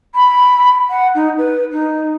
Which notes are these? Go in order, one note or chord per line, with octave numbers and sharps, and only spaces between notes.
B5
F#5
D#4
B4
D#4